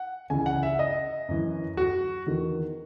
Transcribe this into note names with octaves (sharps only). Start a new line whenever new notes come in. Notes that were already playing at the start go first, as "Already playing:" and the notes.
Already playing: F#5
C#2 C#3 E3 G#5
F#5
E5
D#5
F#2 E3
F#4
E2 D#3